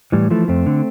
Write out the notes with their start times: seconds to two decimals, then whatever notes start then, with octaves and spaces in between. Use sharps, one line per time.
0.12 A2 E3 G3
0.30 E3 F3 A3
0.48 F2 A3 C4
0.66 D3